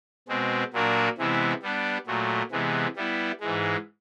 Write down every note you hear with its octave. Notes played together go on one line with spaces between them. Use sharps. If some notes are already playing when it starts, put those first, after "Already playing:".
B2 G#3 C4
A#2 F#3 A#3 D4 F#4
C3 E3 G#3 B3 E4
G3 B3 D4
A#2 F#3 A3
C3 E3 G#3 B3
G3 B3 E4
G#2 E3 G#3